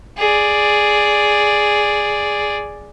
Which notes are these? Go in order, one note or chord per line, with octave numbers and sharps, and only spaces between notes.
G#4 D5